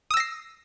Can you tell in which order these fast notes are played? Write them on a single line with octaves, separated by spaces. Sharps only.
D#6 E6 A#6 C7